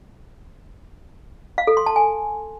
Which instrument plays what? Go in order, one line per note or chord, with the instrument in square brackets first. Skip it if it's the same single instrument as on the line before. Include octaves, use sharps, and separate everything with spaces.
[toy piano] F5
A4
C6
A5
G#5